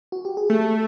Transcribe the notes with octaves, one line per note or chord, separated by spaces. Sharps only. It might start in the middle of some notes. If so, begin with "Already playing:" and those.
F#4
G4
G#4
A3 A4